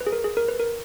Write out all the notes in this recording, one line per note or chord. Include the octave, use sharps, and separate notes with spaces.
B4
G#4
A#4
G#4
A#4
B4
A#4